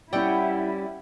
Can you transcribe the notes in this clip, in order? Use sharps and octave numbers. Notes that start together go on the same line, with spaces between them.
G3 C#4 E4 D5 F#5 G5 E6